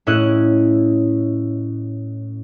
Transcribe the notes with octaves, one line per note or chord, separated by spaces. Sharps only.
A2 C#4 E4 D#5 F#6